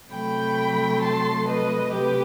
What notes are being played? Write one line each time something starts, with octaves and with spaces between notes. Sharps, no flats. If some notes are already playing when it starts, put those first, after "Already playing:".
C3 F#3 A3 G5 B5
A5 C6
B4 D#5
C3 F#3 A3 G4 B4